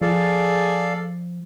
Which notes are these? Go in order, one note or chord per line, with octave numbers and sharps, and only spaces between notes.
F3 G#4 A4 D5 F5